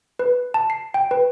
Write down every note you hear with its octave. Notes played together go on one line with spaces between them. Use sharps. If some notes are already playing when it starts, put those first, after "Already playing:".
B4
A5
C7
G5
B4